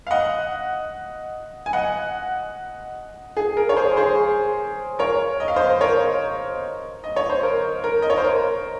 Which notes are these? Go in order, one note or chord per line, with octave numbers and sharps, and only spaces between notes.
F5
D#5 F#5
G#5
D#5 F#5
G#4
A#4
C#5
G#4 C5
G#4 C5
A#4 C#5
D#5
F5
C5 D#5
A#4 C#5
D#5
C#5
C5
A#4
A#4
D#5
C#5
C5
A#4